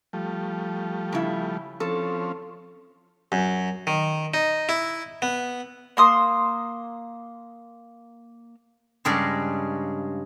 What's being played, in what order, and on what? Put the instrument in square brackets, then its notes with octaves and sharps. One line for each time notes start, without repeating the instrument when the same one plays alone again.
[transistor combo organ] F3 G3 A3
[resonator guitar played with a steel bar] C#3 E4
[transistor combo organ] F3 C4 C#4 [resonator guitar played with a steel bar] A4
[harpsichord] F#2
D#3
D#4
E4
B3
[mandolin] A#3 C6 D#6
[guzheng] G2 C#3 G#3 D5